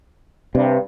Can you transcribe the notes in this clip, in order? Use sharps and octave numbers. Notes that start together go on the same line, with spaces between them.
G2 C3